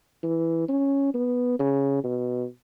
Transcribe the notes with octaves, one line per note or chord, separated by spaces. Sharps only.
E3
C#4
B3
C#3
B2